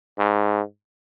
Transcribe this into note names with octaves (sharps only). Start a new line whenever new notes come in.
G#2